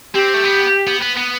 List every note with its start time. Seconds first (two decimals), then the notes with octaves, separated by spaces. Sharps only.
0.14 C4 G4
0.34 A3
0.44 B3
0.87 B3
1.02 B3
1.17 B3